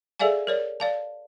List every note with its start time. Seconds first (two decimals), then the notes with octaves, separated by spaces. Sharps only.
0.20 G#4 A4 D5 E5 F5 G#5
0.47 A#4 C#5 D5
0.80 D5 F5 A5